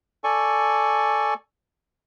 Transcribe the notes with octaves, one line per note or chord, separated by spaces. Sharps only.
A4 D5 G#5 C#6